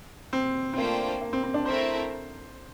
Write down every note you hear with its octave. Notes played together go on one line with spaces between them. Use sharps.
C4
C4
A3 A#3 D4 F4 C5 G5
A#3
C4
C4
D4
A3 C4 E4 A#4 C5 E5